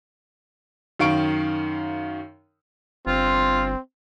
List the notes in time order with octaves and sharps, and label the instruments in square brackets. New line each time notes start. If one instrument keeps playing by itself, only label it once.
[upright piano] F#2 D#3 F5 C#6 D7
[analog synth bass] G1 [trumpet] C4 [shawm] F4